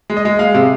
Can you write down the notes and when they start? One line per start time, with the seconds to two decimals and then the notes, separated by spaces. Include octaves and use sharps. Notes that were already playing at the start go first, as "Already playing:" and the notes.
0.10 G#3
0.17 D#5
0.25 G#3
0.39 G#3 F5
0.54 C3